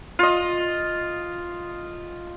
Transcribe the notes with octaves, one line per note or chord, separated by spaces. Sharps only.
F4 D#5